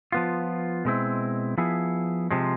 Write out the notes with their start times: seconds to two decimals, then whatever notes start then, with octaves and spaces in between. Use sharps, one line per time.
0.12 F3 B3 F4
0.85 B2 G#3 C4 E4
1.58 F3 B3 E4 G#4
2.31 C3 F3 G#3